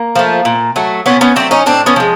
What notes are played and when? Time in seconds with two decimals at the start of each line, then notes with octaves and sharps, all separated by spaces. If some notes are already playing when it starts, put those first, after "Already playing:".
Already playing: A#3
0.15 F3 A3
0.45 A#2
0.76 F#3 A3
1.06 A#2 B3 C#4
1.21 B3 C#4
1.36 F#3 A3 C4 D4
1.51 C#4 D#4
1.66 A2 C4 D4
1.86 B3 C#4
1.96 F3 G#3